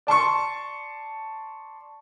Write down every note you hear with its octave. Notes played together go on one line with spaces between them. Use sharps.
D5 A5 C6 C#6